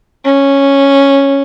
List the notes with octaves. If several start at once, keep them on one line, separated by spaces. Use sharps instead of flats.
C#4